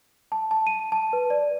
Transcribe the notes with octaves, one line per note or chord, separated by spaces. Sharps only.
A5
A5
D#7
A5
B4
D5